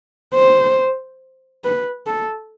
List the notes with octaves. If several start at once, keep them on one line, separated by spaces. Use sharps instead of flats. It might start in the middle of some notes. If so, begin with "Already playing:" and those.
C5
B4
A4